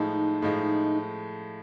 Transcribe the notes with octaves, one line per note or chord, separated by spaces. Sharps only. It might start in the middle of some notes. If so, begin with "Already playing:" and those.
Already playing: A2 F3 G#3 D#4
A2 F3 G#3